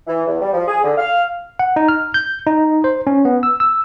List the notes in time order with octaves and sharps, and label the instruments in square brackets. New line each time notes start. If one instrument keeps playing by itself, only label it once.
[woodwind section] E3
E2
G3
F3
G#4
D3
F5
[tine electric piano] F#5
D#4
F6
G6
D#4
C5
C#4
B3
E6
E6